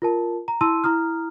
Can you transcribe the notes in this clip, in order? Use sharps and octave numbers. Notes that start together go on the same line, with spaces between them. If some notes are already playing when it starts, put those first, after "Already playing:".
F4 A#4 A5
A#5
E4 A5 C6 E6 D#7
E4 A#5 D#6 F6